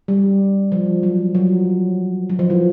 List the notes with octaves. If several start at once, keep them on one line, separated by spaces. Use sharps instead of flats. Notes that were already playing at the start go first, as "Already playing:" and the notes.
G3
F3
F#3
F#3
F#3
F3
E3